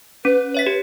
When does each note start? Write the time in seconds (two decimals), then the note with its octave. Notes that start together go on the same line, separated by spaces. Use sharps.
0.25 C#4 B4
0.54 C#5 E5 B6
0.67 G4